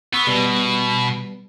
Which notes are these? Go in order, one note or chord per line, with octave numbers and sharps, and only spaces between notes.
B3 C#6 E6 B6
B2 G3 B3